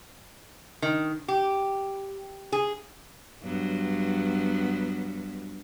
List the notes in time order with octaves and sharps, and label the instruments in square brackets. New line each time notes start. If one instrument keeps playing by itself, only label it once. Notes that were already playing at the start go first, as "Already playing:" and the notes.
[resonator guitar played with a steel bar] D#3
G4
G#4
[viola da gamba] G2 F#3 B3